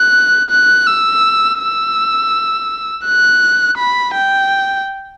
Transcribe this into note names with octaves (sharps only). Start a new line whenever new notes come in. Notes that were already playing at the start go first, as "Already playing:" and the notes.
Already playing: F#6
F#6
E6
E6
F#6
B5
G5